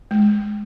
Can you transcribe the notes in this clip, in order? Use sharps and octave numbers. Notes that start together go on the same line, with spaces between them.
G#3